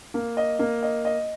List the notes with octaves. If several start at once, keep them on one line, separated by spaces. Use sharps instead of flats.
A#3
D#5
A#3
D#5
D#5